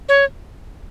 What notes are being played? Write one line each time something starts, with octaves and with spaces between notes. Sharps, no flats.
C#5